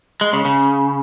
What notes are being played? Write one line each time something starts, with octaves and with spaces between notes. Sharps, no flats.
G#3
C#3
C#3